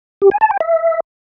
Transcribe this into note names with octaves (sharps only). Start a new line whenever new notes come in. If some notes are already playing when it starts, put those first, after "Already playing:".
G4
G#5
A5
G5
E5